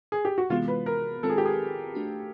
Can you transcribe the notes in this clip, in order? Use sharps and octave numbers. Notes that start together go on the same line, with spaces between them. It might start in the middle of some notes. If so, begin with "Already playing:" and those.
G#4
G4
F#4
C3 E3 G#3 B3 F4
B4
A#4
D#3 G#3 C4 F4 A4
G#4
G4
G#4
A3 D4 F#4